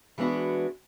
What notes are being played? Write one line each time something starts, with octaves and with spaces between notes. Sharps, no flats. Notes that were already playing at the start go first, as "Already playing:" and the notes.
E3 G#3 B3 D4 F#4